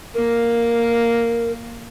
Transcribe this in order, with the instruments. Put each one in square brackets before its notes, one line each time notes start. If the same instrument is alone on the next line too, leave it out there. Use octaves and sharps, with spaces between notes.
[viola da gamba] A#3 [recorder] A#4